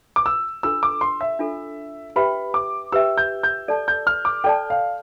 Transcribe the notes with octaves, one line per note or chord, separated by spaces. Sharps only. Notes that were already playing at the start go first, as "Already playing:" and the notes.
D6
E6
D4 F4 A4 E6
D6
C6
E5
D4 F4 A4
G4 B4 E5 G5 B5
D6
G4 B4 E5 G5 E6
G6
G6
A4 D5 A5
G6
F6
D6
A4 D5 G5 A5
F5